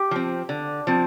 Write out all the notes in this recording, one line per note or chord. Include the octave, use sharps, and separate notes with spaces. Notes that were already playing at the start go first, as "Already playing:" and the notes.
Already playing: G4
F3 C4
D3
F3 C4